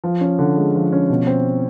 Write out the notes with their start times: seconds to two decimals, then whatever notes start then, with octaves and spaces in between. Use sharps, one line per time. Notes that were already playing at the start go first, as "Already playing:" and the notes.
0.04 F3
0.21 C#4
0.39 D3
0.57 G#3
0.75 F3
0.93 C#4
1.10 B2
1.27 C4